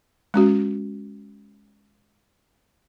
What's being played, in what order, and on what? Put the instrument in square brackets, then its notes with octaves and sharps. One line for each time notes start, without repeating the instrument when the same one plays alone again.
[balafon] G#3 C#4 F#4